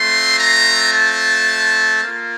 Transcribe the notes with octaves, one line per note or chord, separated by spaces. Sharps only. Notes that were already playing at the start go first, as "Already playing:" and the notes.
Already playing: A3 C4 F4 C6
A#5
A5
A#3 F4